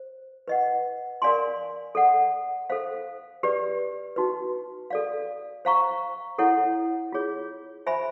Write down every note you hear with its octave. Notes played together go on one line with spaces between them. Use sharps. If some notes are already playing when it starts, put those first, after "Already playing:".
Already playing: C5
B4 D#5 F#5
A#4 D5 F5 G#5 C6
A4 D5 F#5
A4 C5 F5
G4 B4 D5
D#4 F#4 B4
A4 D5 F5
C5 F5 A#5 C#6
E4 A4 C#5 F#5
F4 G#4 C#5
C5 E5 G#5 B5